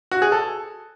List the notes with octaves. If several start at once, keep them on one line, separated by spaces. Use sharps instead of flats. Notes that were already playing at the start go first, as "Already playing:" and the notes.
F#4
G#4
A4